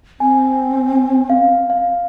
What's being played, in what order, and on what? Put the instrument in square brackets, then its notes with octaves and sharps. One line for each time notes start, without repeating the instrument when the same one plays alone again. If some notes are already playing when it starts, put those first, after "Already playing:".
[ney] C4 [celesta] G#5
[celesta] F5
F5